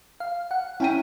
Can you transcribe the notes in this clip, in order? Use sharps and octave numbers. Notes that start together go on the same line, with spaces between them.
F5
F#5
C#4 E4 G5 D#7